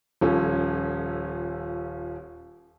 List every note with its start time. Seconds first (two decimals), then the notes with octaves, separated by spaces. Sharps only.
0.21 D#1 F3 C#4 A4